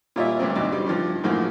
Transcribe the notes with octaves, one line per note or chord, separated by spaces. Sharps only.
A#2 G3 F4 C#5 D#5 E5
D2 G2 C4
D2 B2 F#3 D#4 D6
G3
G2 F3
F#2 A2 C#3 F3 A#3 F#4